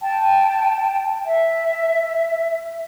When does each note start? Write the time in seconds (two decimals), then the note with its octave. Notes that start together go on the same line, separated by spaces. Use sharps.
0.01 G5 A5
1.25 E5